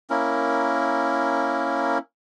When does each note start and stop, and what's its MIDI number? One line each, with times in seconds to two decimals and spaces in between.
0.10 1.98 58
0.10 1.98 61
0.10 1.98 64
0.10 1.98 70